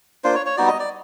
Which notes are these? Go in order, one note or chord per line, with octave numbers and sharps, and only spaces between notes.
A#3 D4 F4 C5
C#5
C#5
G3 B3 D#4 F#4 D5
D#5
D5